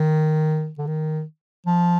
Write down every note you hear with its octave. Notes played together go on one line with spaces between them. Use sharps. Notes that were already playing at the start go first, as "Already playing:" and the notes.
Already playing: D#3
D3
D#3
F3